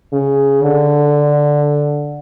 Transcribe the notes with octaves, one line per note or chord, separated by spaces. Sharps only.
C#3
D3